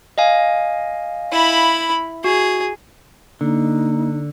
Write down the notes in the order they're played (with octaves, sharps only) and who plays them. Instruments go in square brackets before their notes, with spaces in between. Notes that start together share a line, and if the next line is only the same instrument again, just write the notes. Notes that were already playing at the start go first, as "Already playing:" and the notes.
[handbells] D#5 F5 G#5
[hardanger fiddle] E4 B5
[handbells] F#4 [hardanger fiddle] G#4
[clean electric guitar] D3 [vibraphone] A#3 [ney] D#4